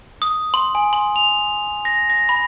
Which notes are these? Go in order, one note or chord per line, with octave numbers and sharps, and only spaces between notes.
D#6
C6
G#5
C6
F7
A#6
A#6
B5